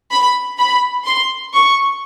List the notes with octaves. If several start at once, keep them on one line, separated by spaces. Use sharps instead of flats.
B5
B5
C6
C#6